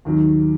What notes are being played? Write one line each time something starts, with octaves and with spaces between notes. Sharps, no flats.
D#2 D#3 F#3